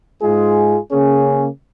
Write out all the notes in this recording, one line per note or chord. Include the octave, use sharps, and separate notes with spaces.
G#2 G#3 F4 G#4
C#3 A#3 C#4 G#4